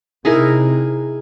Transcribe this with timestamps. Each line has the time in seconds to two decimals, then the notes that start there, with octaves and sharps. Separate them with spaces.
0.25 C3 D#4 E4 G#4 A#4